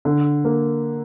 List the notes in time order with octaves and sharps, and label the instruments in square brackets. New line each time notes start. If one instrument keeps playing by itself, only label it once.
[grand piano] D3
A#3